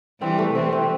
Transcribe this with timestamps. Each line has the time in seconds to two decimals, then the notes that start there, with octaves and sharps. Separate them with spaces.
0.21 E3 G3 C4
0.39 A3
0.55 C3 E3 C4
0.72 C4